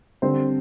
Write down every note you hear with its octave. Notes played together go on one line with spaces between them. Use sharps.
D3 G3 C4 C5